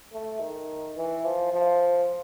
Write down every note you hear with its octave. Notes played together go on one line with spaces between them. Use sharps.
A3
D#3
E3
F3
F3